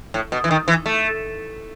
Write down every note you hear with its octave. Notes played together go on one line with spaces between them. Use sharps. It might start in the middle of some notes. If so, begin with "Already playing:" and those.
A2
B2
E3
D#3
E3
A3